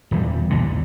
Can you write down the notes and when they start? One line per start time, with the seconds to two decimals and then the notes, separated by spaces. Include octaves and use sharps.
0.11 D#1 E2 G3
0.50 B1 E2 A#2 D3